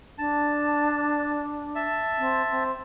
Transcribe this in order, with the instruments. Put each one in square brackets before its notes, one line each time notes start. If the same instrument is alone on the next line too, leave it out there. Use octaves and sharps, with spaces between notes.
[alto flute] D4 [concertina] A5
[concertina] E5 A5
[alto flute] C4
C4